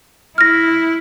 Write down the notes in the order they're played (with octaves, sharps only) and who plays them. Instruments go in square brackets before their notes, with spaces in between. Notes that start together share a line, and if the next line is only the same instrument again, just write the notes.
[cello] E4 [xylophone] F6 A#6